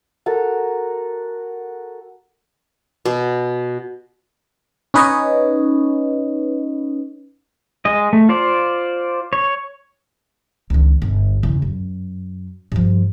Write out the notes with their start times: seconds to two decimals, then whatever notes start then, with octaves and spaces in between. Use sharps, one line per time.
0.26 F#4 A4 A#4
3.05 B2
4.94 C#4 D#4 B4 C#5 D#5
7.85 G#3 D#5
8.13 A3
8.29 F4 C5 D5
9.33 C#5
10.70 C#2 D#3
11.02 G1
11.43 E2 C#3
11.62 F#2
12.72 G2 F3